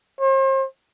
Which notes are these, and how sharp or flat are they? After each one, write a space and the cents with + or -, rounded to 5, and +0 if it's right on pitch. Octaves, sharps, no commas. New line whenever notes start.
C5 +40